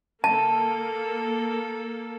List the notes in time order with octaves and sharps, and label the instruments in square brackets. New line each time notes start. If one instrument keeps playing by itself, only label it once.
[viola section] A#3 A4 [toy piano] A5